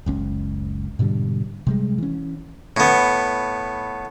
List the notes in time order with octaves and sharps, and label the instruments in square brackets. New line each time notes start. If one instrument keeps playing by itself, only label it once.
[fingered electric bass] F#1 C#2 C#4
G#2 B2 D3 G3
C3 G3 G#3
E3 C#4
[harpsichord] A2 B3